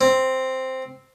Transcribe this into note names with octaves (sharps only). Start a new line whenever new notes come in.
C4